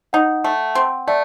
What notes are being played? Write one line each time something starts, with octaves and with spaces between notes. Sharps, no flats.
D#4 F#5
A3
C4
A3 D5